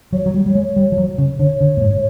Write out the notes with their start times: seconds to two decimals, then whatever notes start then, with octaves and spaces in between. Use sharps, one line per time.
0.13 F#3 C#5
0.26 F#3
0.34 G3
0.46 G3
0.55 G#3
0.76 G3
0.92 F3
0.98 F#3
1.18 C#3
1.39 D3 C#5
1.61 D3
1.77 A2
1.81 G#2